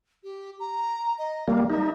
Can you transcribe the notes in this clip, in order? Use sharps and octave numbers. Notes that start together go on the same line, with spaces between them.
G4
A#5
D#5
G3 A#3 F5
D#4 E5